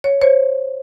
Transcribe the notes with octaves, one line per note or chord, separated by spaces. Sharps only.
C#5
C5 C#5